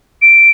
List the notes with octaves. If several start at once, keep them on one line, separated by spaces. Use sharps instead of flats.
D7